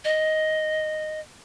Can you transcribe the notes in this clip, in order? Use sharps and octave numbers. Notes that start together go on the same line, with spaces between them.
D#5